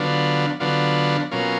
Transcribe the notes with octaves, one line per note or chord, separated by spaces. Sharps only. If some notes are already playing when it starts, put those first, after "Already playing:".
Already playing: D3 F#3 B3 D4 F4
D3 F#3 B3 D4 F4
B2 F#3 A#3 C#4 F4